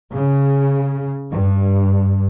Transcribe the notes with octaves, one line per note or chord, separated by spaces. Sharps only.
C#3
G2